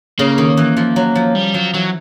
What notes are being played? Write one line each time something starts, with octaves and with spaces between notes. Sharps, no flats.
C#3 A#3
D#3
E3
F3
F#3
F3
G3
F3 F#3
E3 F#3